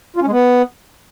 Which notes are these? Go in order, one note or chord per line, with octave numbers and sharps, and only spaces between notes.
F4
C#4
G#3
B3